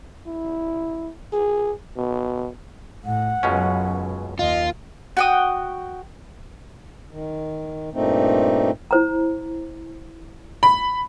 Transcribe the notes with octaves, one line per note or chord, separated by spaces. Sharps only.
E4
G#4
B2
A2 F#5
C#2 F#2 B2 F#3 C#4
D#2 F4 D#5
F#4 G5 D#6
D#3
G2 A#2 A3 C4 D#4
E4 C5 A#5
B5